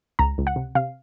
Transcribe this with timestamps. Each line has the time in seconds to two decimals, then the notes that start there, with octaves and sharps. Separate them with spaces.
0.19 C#2 A#5
0.38 C#2
0.47 F#5
0.56 C3
0.75 C3 F5